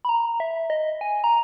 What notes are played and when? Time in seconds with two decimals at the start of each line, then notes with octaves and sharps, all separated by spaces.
0.05 B5
0.09 A#5
0.40 E5
0.70 D#5
1.01 G#5
1.24 A#5